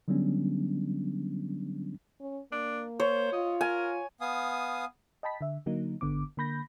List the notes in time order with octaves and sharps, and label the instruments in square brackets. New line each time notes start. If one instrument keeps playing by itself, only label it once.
[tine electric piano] D3 F#3 G3 B3 C#4 D4
[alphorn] C#4
[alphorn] A#3 [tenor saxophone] D4
[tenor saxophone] C5 [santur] C#5
[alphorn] F4 [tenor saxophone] D#5
[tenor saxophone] A#4 [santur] G#5
[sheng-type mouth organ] B3 F5 G#5 D#6
[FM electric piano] D#5 G5 A5 B5 B6
D3 E5
D3 F#3 A#3 D#4
G#1 D3 B3 D6
D3 A#3 B5 G6 A#6